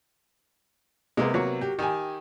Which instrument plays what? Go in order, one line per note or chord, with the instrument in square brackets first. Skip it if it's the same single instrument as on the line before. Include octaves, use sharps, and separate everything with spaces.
[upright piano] C3 B3 [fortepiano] G#3 A#3
[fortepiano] F#3 A#3 C#5
[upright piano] G4
[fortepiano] D#3 [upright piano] G4 G#5